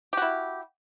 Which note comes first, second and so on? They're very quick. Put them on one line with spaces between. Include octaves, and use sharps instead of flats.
G4 F#4 E4